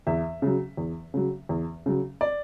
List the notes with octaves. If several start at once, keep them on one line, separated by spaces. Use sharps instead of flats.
E2 E5
C#3 F#3
E2
C#3 F#3
E2
C#3 F#3
D5